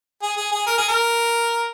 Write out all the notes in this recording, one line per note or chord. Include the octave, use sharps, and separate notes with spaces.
G#4
G#4
G#4
A#4
G#4
A#4